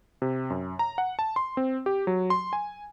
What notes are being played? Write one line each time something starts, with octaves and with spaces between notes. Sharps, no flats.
C3
F#2
A#5
F#5
A5
C6
C4
G4
F#3
C6
G#5